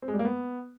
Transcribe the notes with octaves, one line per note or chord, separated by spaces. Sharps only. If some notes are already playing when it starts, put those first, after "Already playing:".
C4
G#3
G3
A#3
B3